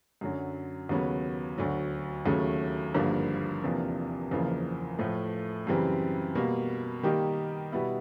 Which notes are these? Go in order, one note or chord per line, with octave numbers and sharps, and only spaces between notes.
F#2 D3 F#3
D#2 C#3 F#3 B3
D2 D3 F#3
D#2 C#3 F#3 A3
G#1 G2 D3 F3 A#3
E2 C3 F3 A#3 D4
F#1 E2 C#3 F3 A#3
A2 F3 A3
F#2 C#3 E3 G3 C4
B2 G3 A#3
D#3 G3 A#3 D#4 G4
B2 G3 B3 E4